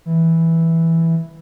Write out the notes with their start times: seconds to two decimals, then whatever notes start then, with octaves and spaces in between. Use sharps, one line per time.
0.06 E3